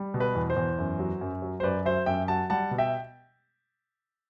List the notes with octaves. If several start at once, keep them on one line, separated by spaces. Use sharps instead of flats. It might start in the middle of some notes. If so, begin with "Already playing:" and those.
Already playing: G3
B2
B4
E2
C5
E2
F#2
F#3
F#2
F#3
C5
F#2 B4 D5
F#3 C5 E5
F#2 E5 G5
F#3 F#5 A5
G3 F#5 A5
B2
E5 G5